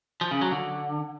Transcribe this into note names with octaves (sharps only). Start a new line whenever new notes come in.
F3
C#3
F#3
D3